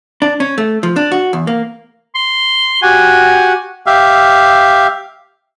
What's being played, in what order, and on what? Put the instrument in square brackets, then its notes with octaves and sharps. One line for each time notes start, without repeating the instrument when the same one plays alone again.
[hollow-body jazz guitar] D4
C#4
A3
F3
D4
F#4
E2
A#3
[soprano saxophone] C6
[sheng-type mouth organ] F#4 G4 F#5 [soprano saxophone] G#5
[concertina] G4 E5 F5